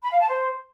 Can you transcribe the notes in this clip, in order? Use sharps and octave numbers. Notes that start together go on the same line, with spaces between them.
B5
F5
A5
C5